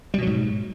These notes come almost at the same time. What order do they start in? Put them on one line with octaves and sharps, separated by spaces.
G3 B2 F#3 G#2